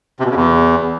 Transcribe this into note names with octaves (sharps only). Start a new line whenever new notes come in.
C3
B2
C#3
E2